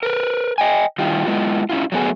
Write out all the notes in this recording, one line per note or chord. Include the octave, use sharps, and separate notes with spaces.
A#4 B4
D#5 G5 G#5
D#3 G3 E4 F4 G4
G#3 B3 E4 F4
C#4 E4 F4
F#3 A3 B3 G#4